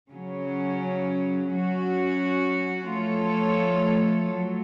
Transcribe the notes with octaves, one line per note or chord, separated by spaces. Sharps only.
C#3 F#3 C#4
F#3 C#4 F#4
F3 A3 F4 A4 C#5
F#3 A3